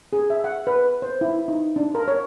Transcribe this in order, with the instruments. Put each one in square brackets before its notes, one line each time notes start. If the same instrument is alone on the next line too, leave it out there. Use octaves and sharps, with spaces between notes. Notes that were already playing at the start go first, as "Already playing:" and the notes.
[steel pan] G#4
E5
F#5
B4
C5
E4
D#4
D4
A#4
C#5